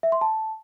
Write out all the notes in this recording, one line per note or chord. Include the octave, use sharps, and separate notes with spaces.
E5
C6
A5